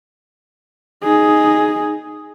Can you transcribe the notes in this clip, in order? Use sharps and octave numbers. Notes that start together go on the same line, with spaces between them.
D#4 G#4